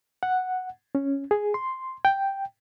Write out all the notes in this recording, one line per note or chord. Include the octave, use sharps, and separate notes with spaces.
F#5
C#4
G#4
C6
G5